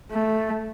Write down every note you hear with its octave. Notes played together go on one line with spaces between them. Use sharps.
A3